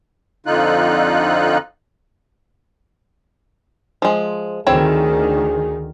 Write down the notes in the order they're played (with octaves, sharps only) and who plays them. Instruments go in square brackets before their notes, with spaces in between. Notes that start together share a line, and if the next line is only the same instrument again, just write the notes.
[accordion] F2 D3 D#4 F4 F#6
[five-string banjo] F3 G#3
[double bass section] D2 D#3 [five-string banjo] C4 E4 C#5 [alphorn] G#4